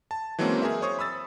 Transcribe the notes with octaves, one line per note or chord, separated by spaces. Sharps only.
A5
E3 F#3 G#3 A#3 C4 C#4
G#4 A#4 E5
C5 C#5 C#6 D#6
B5 D#6 E6 A6